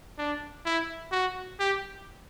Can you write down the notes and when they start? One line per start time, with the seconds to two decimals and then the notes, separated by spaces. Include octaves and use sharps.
0.18 D4
0.65 E4
1.12 F#4
1.59 G4